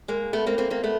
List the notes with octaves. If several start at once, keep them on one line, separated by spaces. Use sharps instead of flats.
G#3 A#3
A3 B3
A#3 C4
A#3 C4
A#3 C4
A3 B3